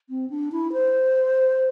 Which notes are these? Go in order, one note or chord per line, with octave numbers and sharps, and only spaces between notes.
C4
D4
E4
C5